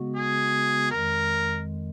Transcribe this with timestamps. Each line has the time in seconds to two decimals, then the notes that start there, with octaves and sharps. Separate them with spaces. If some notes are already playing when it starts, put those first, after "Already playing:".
Already playing: C#3 G#3 B3 F#4
0.16 G#4
0.91 F2 D#3 G#3 A#4